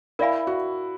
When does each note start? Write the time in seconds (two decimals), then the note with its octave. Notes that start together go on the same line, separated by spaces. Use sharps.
0.19 E4 A#4 D5 F5 G#5 B5
0.47 F#4